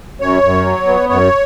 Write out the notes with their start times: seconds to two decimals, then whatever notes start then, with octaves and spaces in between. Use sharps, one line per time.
0.21 F#2 C#5
0.43 F#2
0.66 F#3
0.87 B3
1.09 F#2 C#5